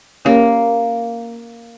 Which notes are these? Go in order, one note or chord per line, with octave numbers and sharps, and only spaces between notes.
A#3 C#4 G4 A#4 C#5